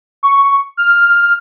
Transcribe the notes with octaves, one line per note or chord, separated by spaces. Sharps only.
C#6
F6
F6